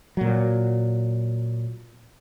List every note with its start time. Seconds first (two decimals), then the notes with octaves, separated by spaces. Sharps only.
0.17 A#2 F#3